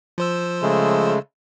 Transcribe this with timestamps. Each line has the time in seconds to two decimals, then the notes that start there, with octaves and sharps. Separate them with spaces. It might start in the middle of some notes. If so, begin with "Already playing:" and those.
0.18 F3 C5 E6
0.62 C#3 G#3 A3